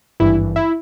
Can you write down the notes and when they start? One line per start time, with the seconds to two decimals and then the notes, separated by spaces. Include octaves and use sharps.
0.20 G#1 G2 E3 E4
0.56 E4